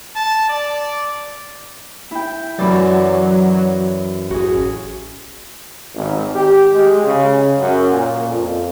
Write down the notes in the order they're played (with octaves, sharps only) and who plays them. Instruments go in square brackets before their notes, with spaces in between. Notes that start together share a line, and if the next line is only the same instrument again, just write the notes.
[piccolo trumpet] A5
D5
[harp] E4 G5
[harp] F#2 E3 D5 [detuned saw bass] F#3
[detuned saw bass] A1 [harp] F#4 G#4
[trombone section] G#1
G4
G#3
C#3
F#2
A#2
F2